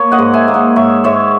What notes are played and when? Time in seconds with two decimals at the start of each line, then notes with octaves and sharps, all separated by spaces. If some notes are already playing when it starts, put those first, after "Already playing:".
Already playing: A#3 C#5
0.12 D#5 F#5
0.18 G#2
0.33 E5 G#5
0.48 A#3
0.54 D#5 F#5
0.76 G#2 C#5 E5
1.04 G#2 C#5 E5